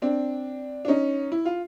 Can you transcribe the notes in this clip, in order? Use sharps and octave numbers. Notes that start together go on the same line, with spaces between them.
C4 D4
D4
C#4 D#4
E4
F4